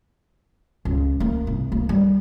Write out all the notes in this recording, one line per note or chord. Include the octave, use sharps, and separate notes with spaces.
C#2
A#3
C2
A#3
G3